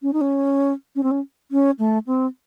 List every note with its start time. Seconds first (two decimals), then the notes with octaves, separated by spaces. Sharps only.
0.02 C#4
0.13 D#4
0.21 C#4
0.96 C#4
1.03 C4
1.11 C#4
1.51 C#4
1.79 A3
2.07 C4